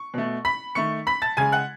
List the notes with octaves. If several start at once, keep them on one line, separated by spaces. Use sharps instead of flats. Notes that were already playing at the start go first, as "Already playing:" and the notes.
Already playing: C#6
B2 A3
B5 B6
D#3 A3 C#6 C#7
B5 B6
A5 A6
C#3 G#3 G#5 G#6
F#5 F#6